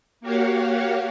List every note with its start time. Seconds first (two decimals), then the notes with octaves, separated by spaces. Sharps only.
0.21 A#3 F#4 G4 C#5 F5 F#5